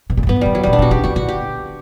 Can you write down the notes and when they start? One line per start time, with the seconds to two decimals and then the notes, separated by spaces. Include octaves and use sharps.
0.10 B2
0.17 A#2
0.23 F#2
0.27 G2 B3
0.36 E2
0.41 F#2 G3
0.55 F#3
0.63 A#2 G3
0.73 D4
0.79 B2 F#4
0.91 C#3 G4
1.04 D3 F#4
1.16 D3 F#4
1.29 G4